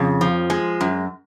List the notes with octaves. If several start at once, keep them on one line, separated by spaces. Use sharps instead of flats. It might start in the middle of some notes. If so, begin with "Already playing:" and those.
Already playing: F2 C#3
F3
G#3
F#2